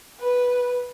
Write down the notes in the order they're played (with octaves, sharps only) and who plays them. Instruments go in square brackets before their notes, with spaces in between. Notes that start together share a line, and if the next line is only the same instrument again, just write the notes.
[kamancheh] B4